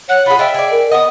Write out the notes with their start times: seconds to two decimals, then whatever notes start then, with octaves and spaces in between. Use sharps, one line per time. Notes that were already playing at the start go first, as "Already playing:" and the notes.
0.09 C#5 F#5 F#6
0.26 F4 G#4 B5
0.39 F4 D#5 E5 G5
0.54 G#4 D5
0.71 A#4
0.91 B3 D#5 F#5 D#6